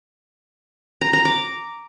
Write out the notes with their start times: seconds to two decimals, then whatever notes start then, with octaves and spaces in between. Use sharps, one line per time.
1.01 A#5
1.13 A#5
1.25 D6